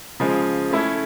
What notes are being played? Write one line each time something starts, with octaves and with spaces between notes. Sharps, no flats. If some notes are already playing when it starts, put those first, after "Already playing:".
C#3 F3 G#3
A3 C#4 E4 A4